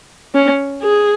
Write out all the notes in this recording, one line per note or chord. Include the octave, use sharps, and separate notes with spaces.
C#4
G#4